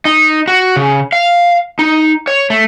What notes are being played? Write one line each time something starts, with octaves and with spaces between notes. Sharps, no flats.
D#4
F#4
C#3
F5
D#4
C#5
A3